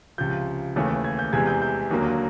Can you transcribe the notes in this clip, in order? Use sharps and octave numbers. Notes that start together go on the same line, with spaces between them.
C#2 C3 F3 G6
D#2 C#3 E3 A3 C#4
G#6
G6
E2 C3 E3 G#3 G#6
G6
G6
D#2 D3 F#3 A#3